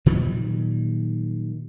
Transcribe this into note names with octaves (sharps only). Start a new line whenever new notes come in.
A#2 D#3 F#3 G3